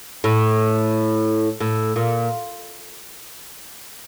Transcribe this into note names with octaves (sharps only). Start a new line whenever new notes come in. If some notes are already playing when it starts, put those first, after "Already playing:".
A2
A2
A#2